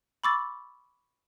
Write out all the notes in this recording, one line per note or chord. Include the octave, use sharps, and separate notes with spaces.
B5 C#6 D6 E6 A6